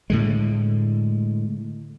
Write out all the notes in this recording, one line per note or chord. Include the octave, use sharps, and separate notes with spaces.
A2 D3 G#3